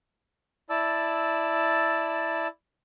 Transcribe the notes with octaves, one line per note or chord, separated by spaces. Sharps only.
E4 D5 A5 E6